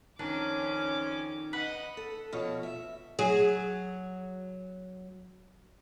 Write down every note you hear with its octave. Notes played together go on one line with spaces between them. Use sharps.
F2 D#3 C#4 D4 D6
B4 D#5 F#5
A4
B2 F3 F#4 C#5
E5
F#3 G#4